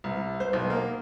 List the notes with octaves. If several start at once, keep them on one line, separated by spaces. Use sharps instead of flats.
C2
C5
B1
A#3